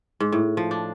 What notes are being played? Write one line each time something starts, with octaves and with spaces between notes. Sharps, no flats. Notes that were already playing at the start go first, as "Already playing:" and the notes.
G#2
A2
F3
D4